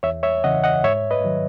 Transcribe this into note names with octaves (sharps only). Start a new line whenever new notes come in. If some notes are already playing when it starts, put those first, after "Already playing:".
E2 C#5 E5
C#5 E5
C#3 E3 D#5 F#5
D#5 F#5
G#2 C#5 E5
B4 D#5
D#3 F#3